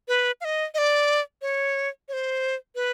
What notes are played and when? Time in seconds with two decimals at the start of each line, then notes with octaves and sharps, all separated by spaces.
0.08 B4
0.41 F5
0.45 D#5
0.74 D#5
0.78 D5
1.42 C#5
2.08 C#5
2.13 C5
2.75 B4